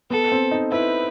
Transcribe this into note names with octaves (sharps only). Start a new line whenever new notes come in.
B3 A4
C4
D#4
E4 B4